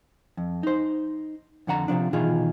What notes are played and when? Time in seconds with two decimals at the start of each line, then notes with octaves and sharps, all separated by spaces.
0.37 F2
0.63 D#4 C5
1.67 F2 D3 F#5 A#5
1.88 C3 D#3 F3 D4
2.13 B2 D#3 E3 F4 G#4